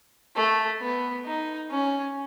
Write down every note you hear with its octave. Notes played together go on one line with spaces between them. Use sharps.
A3
B3
D#4
C#4